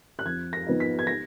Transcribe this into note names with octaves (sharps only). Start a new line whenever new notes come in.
F#6
F2 G#6
A#6
F3 B3 D#4
B6
G#6
A#6